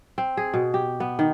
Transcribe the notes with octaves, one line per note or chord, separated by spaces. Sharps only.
C4
G#4
B2
G4
B3
D#3